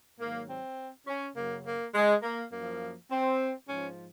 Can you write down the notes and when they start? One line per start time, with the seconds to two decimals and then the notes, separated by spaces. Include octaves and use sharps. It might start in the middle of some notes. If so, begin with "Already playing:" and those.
0.20 G#2 D#3 F#3 A#3
0.49 C4
1.07 C#4
1.36 F#2 C#3 F#3 A#3
1.65 A#3
1.95 G#3
2.23 A#3
2.52 F#2 F3 A#3
3.11 C4
3.69 G#2 F3 C#4